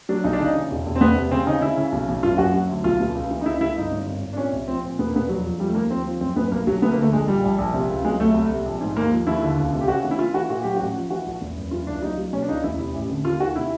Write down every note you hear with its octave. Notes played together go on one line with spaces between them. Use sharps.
F#3 D4
B1 D#4
D4
C#3 D#4
E3
E1
E1
C4
E2 B3
C3
C#3 C4
C#3 D#4
C#3 E4
C#3
B1
B1
F#1 F4
F#2 F#4
F#3
D2
B1 F4
B2
C#2
E3
D#4
C#2 E4
C#2 E4
G1 D#4
G1
G#1
G#1
D4
A#2 C#4
C2
F3 C4
A#2
E1 B3
A#3
E1 B3
F2 F#3
F3
F3 G3
A3
D#2 A#3
F3 C4
F3
F#2 C4
F#2 B3
B1 A#3
B1 F#3
D2 B3
A#3
D3 A3
A#1 G#3
A#2 G3
A#1
A#1
C3
C#2
F#3 G#3
C2 A3
C2
C3
A#1
G#2
D#2 A#3
F3
D#2 E4
D3
C#2
C3
G4
C#3 F#4
E3
E4
E3 F4
E3 F#4
A#2 F#4
F#3 G4
A1 F#4
F3
E3 F#4
A#1
E2
F#1
E3 F4
C#2 D4
F#3 D#4
F#3
B2 C#4
D4
C#2 D#4
E2 E4
C3 E4
A1
D3
D#2 F4
D#3 F#4
C3 E4